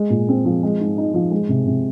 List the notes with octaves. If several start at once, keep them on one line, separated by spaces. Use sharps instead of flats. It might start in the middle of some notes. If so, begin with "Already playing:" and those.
Already playing: G#3
A#2
C4
F3
G#3
G#2
D#4
F3
G#3
C3
C3